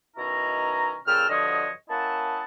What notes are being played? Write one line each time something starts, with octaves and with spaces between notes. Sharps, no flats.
B2 D#3 C#4 E4 A#5
A#2 C#3 A4 G5 E6 F6
G2 D3 F3 F#4 C#5 D#5
A#3 C#4 E4 D#5 F#5 A5